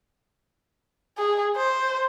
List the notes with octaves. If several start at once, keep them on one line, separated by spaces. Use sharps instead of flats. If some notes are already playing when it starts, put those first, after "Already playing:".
G#4
C5